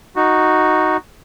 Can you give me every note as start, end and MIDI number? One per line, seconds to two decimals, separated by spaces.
0.16 0.97 63
0.16 0.97 66